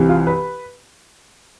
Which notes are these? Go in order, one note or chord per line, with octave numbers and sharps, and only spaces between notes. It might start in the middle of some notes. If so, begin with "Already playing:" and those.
Already playing: C2 C3 E3
F4
B4